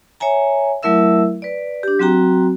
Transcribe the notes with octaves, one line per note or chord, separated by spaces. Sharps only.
C#5 E5 G#5 A#5
F#3 A3 E4 A#4 E5 E6
B4 D5
D4 G4
F#3 C4 F#4 G5 A#5